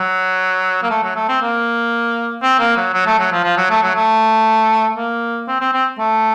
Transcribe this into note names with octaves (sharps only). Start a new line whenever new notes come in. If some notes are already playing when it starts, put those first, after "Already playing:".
Already playing: F#3
A#3
A3
F#3
A3
C4
A#3
C4
A#3
F#3
F#3
A3
F#3
F3
F3
F#3
A3
F#3
A3
A#3
C4
C4
C4
A3